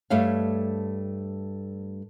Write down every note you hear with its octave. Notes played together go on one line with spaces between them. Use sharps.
G2 G3 A3 C#5 F5